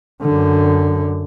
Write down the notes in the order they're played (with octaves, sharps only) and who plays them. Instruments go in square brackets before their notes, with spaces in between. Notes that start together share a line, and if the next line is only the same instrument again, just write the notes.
[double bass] F#2 D3